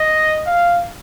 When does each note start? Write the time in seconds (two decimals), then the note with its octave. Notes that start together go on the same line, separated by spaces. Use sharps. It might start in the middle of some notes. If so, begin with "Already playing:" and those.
Already playing: D#5
0.45 F5